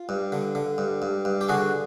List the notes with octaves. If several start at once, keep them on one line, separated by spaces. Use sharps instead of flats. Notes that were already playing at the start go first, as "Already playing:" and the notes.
Already playing: F4
G2
D3
D3
G2
G2
G2
G4
D3 F#4 G#4